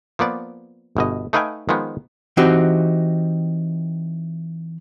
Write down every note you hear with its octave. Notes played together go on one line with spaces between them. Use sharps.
F3 A#3 B3 D5
G1 B2 D#5
A3 D#4 B4 F5 G5 G#5
D#3 F3 G#3 B3
E3 C4 D#4 F#4 G4